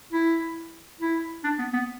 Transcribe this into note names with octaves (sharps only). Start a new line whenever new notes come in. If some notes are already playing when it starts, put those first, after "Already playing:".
E4
E4
D4
B3
B3